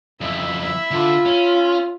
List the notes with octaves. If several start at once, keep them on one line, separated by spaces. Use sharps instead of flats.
F2 C#3 E4 E5
D3 F4 A4
C#4